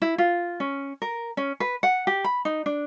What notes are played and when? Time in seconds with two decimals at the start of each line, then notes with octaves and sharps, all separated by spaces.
0.02 E4
0.18 F4
0.60 C#4
1.02 A#4
1.37 C#4
1.60 B4
1.83 F#5
2.07 G4
2.24 B5
2.45 D#4
2.66 D4